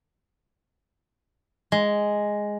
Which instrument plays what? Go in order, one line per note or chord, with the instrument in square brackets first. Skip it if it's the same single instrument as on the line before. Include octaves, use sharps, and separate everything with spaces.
[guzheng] G#3